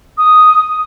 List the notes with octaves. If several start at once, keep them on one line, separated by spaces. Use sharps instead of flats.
D#6